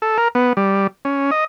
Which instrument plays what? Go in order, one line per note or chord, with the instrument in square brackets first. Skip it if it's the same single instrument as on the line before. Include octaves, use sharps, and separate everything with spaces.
[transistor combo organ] A4
A#4
B3
G3
C#4
D#5